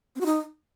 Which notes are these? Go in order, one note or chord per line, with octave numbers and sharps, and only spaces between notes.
C4
F#4
D#4